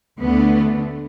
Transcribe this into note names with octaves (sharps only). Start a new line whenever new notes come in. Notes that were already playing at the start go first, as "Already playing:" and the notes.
D2 D3 A3 B3